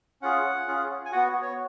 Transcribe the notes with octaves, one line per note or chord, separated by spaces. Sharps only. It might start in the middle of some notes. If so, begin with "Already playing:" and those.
C#4 F4 G#4 F#5
C#4 F4 G#4
G#5
B3 F#4 F#5
C#5